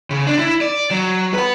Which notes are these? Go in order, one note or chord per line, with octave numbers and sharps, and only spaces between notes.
C#3
D4
E4
D5
F#3
B4 F#5